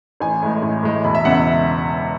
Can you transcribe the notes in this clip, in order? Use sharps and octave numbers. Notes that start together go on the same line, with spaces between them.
A1 G#5
A2 G#3
A1
A2 G#3
E1 B5
E5
E2 C#3 G#3 F#5
E5